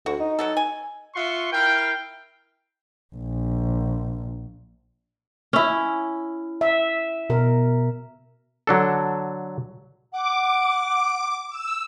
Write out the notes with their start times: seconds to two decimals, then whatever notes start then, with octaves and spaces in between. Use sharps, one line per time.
0.06 D2 F#4
0.20 D#4
0.39 F#3 F#4 A4
0.57 G#5
1.15 F4 E5 F#5 C6 C#6
1.52 E4 A#4 F5 G5
3.15 A#1
5.53 C#4 E4
6.61 E5
7.30 B2 A#4
8.67 D3 F#3 D4 A4
10.12 F#5 D6
11.50 E6